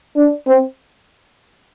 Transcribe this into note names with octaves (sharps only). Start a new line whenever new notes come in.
D4
C4